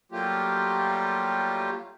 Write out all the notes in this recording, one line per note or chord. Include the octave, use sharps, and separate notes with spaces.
F#3 G3 A3 A#3 F4 G4